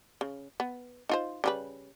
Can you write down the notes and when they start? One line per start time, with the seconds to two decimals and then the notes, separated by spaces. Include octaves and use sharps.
0.21 C#3
0.60 B3
1.09 D#4 F4 C5
1.44 C#3 G3 B4